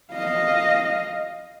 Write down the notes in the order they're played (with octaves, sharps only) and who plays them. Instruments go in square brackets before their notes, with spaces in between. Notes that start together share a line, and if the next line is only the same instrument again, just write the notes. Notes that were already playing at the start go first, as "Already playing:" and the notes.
[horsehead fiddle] D#5 F5